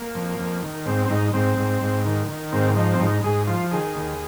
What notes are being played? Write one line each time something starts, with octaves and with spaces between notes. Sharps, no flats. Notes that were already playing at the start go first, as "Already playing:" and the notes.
Already playing: A#3
F2
F2
D#3
G#2 C4
C4
G#2 D#4
G#2 C4
G#2
G#2
D#3
D#3
G#2 C4
F3 D#4
C4
G#2 D#4
G#2 G#4
F3 F4
D#3 G#4
D#2